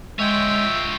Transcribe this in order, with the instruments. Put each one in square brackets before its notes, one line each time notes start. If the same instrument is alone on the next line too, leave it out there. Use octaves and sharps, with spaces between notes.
[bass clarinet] G#3 [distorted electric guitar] F4 C#5 [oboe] E5 [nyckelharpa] G5